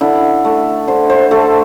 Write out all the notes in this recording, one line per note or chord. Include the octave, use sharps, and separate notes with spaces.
D3 E4
A3
D3 C5
C5
A3 A4